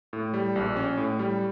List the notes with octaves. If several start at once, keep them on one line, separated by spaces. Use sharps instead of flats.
A2
G3
A#1
C#4
A2
G3